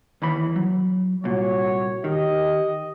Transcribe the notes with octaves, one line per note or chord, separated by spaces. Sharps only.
D#2 E3 B5
F#3
C2 A#2 F#4 C#5
D#3 G4 D#5